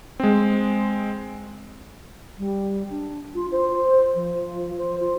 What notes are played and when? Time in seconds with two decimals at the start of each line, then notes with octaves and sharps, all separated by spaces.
0.20 G#3 C4
2.37 G3
2.89 D4
3.34 F4
3.51 C5
4.14 F3
4.77 C5
4.99 F4